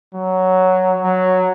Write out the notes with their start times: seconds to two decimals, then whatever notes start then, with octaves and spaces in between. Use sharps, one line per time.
0.14 F#3
1.02 F#3